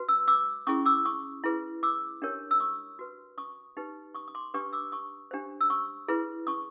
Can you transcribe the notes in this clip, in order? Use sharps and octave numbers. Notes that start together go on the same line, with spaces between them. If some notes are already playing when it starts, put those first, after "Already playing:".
Already playing: F#4 B4
E6
D6 E6
C#4 E4 G#4 C#6 D#6
D6 E6
C#6 D#6
E4 G#4 B4
D6 E6
D4 G4 A#4 C#5
E6
C#6 D#6
F#4 B4
C#6 D#6
D#4 G4 B4
C#6 D#6
D#6
C6 D6
D4 G4 B4 C#6 D#6
D6 E6
C#6 D#6
D4 G4 C5
E6
C#6 D#6
E4 G#4 B4
C#6 D#6